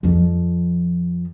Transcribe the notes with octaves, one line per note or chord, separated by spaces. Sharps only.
F2 F3